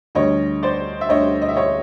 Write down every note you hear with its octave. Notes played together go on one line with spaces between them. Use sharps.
D2 D3 G3 C#5 D#5
C5 D5
E5
D2 D3 G3 C#5 D#5
D#5
E5
C#5 D#5